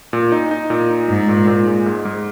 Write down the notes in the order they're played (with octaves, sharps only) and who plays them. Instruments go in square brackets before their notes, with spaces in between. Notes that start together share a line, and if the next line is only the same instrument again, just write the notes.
[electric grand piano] A#2
D#4
D#4
A#2
D#4
[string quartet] G#2 [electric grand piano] D#4
[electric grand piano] A#2
A#2
G#3
G#2
G#2